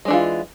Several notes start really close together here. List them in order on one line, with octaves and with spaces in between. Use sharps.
G#3 D4 E3 F4